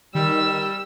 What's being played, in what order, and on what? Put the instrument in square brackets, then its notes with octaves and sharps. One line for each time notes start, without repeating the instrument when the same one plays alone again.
[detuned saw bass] D#3 [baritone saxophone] G3 [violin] E6